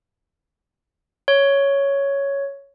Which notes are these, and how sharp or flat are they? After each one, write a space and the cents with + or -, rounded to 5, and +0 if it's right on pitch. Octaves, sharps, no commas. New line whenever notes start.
C#5 +5